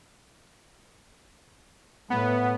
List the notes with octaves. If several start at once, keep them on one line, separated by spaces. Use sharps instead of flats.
A2 B3